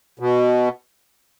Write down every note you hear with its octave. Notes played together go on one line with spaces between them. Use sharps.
B2